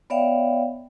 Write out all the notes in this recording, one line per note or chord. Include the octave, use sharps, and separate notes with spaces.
B3 C#5 D5 E5 F5 G5